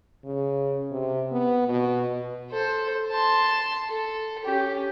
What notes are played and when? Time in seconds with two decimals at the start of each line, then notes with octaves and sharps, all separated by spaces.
0.24 C#3
0.91 C3
1.31 B3
1.68 B2
2.51 A4 C5
3.11 A5 C6
3.89 A4
4.44 C#4 G4